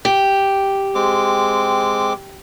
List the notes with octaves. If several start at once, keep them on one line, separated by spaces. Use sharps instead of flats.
G4
G#3 C4 D6